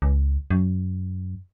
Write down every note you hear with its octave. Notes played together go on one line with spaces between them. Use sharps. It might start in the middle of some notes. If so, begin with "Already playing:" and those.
C#2
F#2